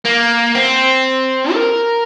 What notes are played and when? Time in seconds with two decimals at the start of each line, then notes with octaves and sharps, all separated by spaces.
0.05 A#3
0.55 C4
1.53 A#4